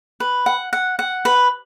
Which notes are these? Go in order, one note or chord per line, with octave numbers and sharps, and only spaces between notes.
B4
F#5
F#5
F#5
B4